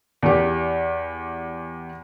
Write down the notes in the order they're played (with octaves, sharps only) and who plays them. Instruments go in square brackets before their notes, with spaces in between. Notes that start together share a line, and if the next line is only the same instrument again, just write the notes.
[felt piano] E2 G4